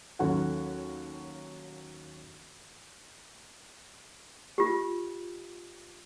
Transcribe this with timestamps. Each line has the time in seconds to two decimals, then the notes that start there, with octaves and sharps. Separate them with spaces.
0.19 D#2 F#3 C#4 F#4 A4 F#5
4.58 F4 G4